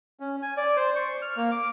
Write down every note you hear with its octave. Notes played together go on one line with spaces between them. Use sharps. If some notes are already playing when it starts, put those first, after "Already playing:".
C#4
G#5
D5
C5
C#6
F6
A#3
D6